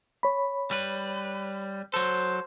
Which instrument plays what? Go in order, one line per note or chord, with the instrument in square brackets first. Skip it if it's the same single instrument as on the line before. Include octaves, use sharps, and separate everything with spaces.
[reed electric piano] C#5 B5
[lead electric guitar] G3 B4
[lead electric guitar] F#3 A4 [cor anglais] C5